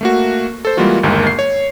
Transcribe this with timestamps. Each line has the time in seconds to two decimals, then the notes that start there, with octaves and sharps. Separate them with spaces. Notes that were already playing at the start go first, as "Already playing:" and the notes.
0.01 A3 A#3 F#4
0.65 A4 C5
0.77 E3 G3 G#3 A#3 F4 F#4
1.03 G1 D#2 G#3 A#3
1.27 C7
1.39 C#5